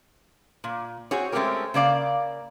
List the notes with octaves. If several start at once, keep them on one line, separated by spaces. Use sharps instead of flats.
A#2
C4 F#4 G#4 C#5
G#3 A3 C4 C#4 G4 A#4
C#3 A#3 D5 F5